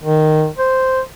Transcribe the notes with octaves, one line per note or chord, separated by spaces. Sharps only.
D#3
C5